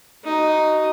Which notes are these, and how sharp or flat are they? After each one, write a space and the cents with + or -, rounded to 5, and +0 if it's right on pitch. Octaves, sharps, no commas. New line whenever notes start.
D#4 +0 F#4 +30